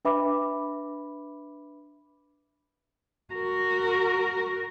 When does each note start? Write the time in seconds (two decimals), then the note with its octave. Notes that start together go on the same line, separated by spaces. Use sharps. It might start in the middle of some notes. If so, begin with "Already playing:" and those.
0.05 D4 B4 E5 B5 D6
3.34 F#4 A#4